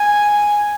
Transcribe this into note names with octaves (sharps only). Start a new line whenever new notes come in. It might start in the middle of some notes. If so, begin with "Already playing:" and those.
Already playing: G#5